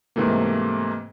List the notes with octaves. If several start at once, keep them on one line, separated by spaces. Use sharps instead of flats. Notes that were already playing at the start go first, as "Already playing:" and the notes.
G#2 C3 E3 A3 A#3